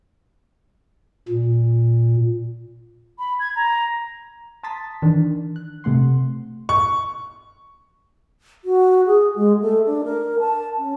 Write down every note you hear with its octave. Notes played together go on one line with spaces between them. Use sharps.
A#2
B5
G#6
A#5
A5 A#5 C6 D#6 A6 B6
D#3 E3 D4
F#6
C3 A3 F#5 C6
C#6
F#4
G#4
G#3
A3
D4
A#4
A5
C#4